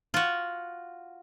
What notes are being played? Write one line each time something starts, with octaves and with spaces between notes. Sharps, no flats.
F4 F#4